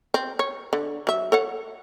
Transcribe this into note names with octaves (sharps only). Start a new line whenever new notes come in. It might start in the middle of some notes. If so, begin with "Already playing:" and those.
C4
C#5
D3
F#3 E5
A4 C#5 F#5